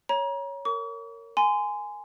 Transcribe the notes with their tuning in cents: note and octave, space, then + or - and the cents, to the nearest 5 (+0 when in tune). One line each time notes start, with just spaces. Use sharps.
C#5 +0 A#5 +35
A#4 -25 C#6 +45
G#5 +0 C6 -25